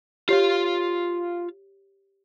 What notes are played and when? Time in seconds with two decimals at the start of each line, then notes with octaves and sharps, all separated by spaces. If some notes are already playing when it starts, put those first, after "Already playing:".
0.29 F4 G4 C#5 F5